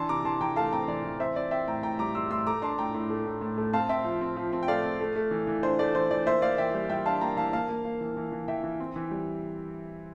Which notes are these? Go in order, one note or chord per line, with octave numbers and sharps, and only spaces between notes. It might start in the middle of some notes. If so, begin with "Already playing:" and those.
Already playing: E3 D4 A5 C6
C3 A#5 D6
E3 A5 C6
E3 G5 A#5
A3 F5 A5
C4 G5 A#5
E3 D5
E3
C4 C5 E5
C4 D5
C4 E5 G5
A2 G5 A#5
A2 G5 A#5
G3 A#5 D6
G3 C6 E6
A2 C6 E6
A3 A#5 D6
D4 A5 C6
A2 G5 A#5
A2
A3
A2
A2
A3
C4 F5 A5
C4 E5 G5
F3
C4
F3
C4
G5
A3 D5 F5
C4
A3
A3
E3
E3
D4 C5
A3 D5
E3 C5
E3 D5
A#3 C5 E5
A#3 D5 F5
E3 E5 G5
G3
G3 E5 G5
D4 F5 A5
A#3 G5 A#5
E3 F5 A5
A#3 F5 A5
A#3
A#3
E3
E3
E3
E3 E5 G5
E3
C4
E3
G3